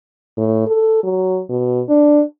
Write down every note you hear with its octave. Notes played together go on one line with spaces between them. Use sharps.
A2
A4
F#3
B2
D4